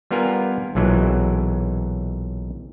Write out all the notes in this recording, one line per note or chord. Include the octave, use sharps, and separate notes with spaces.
G3 B3 F4 A#4 G#5
B1 A#2 E3 F#3 G#3